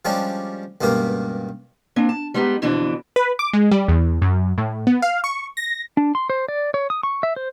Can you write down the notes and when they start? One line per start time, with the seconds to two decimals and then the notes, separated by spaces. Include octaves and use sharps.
0.05 F3 G3 G#3 C#4 D4 G4
0.81 C#2 G2 B2 A#3 G4 A#4
1.96 A#3 C4 D4
2.09 A5
2.34 G3 G#3 B3 D#4 G4
2.62 F2 B2 D3 E3 B3 D4
3.16 B4
3.39 D6
3.53 G#3
3.71 G3
3.88 E2
4.22 F#2
4.58 A2
4.87 B3
5.02 F5
5.24 C#6
5.57 A#6
5.97 D4
6.15 C6
6.30 C5
6.48 D5
6.74 C#5
6.90 D#6
7.03 C#6
7.23 E5
7.36 C5